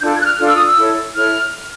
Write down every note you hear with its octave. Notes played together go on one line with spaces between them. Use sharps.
D4 F4 A4 G6
G#6
F#6
F6
D4 F4 A4 F6
E6
D#6
E6
E4 A4 C#5
E4 A4 C#5 F6